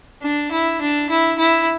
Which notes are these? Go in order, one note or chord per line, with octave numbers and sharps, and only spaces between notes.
D4
E4
D4
E4
E4